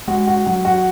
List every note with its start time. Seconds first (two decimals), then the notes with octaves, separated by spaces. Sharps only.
0.08 G#3 F#4
0.27 F#4
0.46 F#3 F#4
0.65 F#4